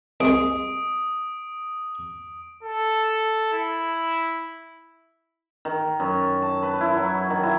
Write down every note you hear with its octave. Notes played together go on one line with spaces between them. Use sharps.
C2 G#3 D#6 D7
A4
E4
D#3
F#2
A5
B4
E4
F#3
D#3
E4